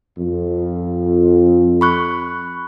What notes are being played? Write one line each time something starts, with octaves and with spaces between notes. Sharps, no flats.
F2
B5 C#6 F#6